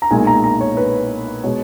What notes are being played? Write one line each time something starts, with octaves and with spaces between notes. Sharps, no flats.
A#5
B1 A#2 G#3 G#5
A#5
A#5
C#5
B4
B2 G#3 C#5